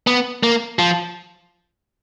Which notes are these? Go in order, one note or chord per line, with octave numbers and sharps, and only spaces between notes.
B3
A#3
F3